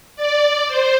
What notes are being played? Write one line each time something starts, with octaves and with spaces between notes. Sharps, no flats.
D5
C5